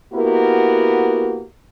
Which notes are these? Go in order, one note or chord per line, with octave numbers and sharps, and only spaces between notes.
A#3 B3 E4 F#4 G4 A#4